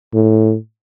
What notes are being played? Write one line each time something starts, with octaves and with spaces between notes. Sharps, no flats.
A2